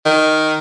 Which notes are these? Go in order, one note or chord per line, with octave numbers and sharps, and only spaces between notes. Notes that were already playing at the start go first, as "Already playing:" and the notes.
D#3